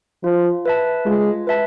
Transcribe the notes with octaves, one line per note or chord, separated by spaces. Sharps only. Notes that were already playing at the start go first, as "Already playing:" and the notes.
F3 F4
B4 E5 A5
G#3 F4
B4 E5 A5